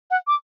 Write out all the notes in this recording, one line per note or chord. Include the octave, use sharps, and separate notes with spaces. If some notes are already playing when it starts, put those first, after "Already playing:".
F#5
D6